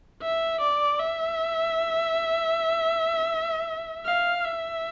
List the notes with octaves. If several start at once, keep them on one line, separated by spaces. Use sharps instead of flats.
E5
D5
E5
F5
E5